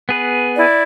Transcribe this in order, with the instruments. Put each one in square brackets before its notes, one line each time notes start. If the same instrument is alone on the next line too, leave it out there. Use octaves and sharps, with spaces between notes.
[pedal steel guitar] B3 G#4 B4
[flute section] E4 D5